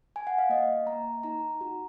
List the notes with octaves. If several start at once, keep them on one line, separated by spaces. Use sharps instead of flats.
G#5
F#5
F5
A#3 D#5
A#3 A#5
D#4 A#5
F#4